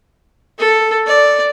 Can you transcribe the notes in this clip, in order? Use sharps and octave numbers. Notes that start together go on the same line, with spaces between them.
A4
D5